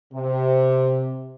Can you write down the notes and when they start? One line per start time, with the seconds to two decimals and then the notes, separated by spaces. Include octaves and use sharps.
0.13 C3